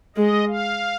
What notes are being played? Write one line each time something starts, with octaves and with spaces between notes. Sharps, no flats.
G#3 D#5
F5